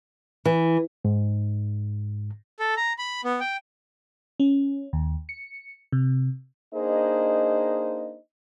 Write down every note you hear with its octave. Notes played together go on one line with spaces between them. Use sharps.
E3
G#2
A4
A#5
B5
B3
G5
C#4
D#2
C#7
C3
A#3 D4 D#4 G#4 C5 D#5